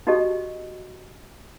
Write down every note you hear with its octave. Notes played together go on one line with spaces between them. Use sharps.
D#4 F#4 G4 A4 D#5